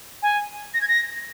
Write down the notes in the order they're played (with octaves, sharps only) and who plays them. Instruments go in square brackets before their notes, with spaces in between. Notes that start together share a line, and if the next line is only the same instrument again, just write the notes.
[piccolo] G#5
A#6
G#6
A#6